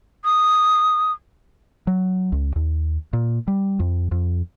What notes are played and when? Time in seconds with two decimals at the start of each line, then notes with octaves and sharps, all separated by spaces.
0.25 D#6
1.87 F#3
2.32 C#2
2.56 D#2
3.13 A#2
3.48 G3
3.80 F2
4.12 F2